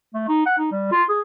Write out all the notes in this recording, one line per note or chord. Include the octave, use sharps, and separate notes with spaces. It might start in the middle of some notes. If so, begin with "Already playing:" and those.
A3
D#4
F#5
D#4
G3
F4
G#4